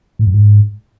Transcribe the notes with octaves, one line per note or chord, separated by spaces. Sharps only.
A2
F#2
G#2